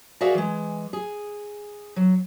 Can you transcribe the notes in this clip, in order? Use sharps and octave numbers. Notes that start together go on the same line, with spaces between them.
F#4 G#4 A#4 D5 E5 F5
E3 G#3
G#4
F#3